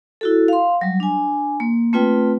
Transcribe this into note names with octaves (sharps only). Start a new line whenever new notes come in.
E4 F#4 A4
F5 C6
F#3 G3
D4 G#5
A#3
A3 C4 F4 B4 G5